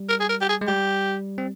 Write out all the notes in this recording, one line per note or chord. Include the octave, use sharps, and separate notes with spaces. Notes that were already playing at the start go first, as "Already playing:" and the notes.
Already playing: G3
A#4
G#4
A#4
G4
G#4
G#3
G3 G4
C4